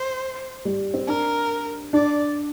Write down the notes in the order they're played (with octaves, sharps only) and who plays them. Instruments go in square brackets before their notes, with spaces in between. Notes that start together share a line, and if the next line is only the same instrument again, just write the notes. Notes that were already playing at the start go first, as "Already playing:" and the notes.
Already playing: [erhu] C5
[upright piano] G3
C4
[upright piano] D4 [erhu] A#4
[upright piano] D4 [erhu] D5